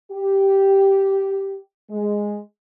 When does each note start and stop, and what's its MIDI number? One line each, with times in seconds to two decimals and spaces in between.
0.11 1.58 67
1.90 2.39 56